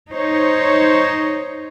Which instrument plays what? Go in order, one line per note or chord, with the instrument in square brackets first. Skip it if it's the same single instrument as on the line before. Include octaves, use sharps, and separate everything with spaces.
[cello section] D#4 C5 C#5